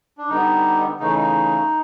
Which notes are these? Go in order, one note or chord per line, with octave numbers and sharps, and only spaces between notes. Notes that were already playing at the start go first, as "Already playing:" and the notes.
D4
D3 G3 B3 D#4
C#3 E3 A3 D#4
D#4